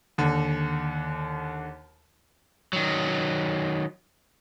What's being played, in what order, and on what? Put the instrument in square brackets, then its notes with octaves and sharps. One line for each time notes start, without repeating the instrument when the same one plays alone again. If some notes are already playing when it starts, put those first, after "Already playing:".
[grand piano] D#2 D3
[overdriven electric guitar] D#3 F#3